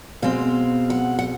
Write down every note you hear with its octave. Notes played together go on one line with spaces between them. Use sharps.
B2 G#3 C4 F5
F#5
F#5